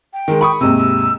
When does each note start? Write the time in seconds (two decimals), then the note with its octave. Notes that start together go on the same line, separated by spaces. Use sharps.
0.13 G5
0.28 D#3 G#3
0.41 B5 C#6 D#6
0.61 D#2 G#2 C3 E6
0.78 E6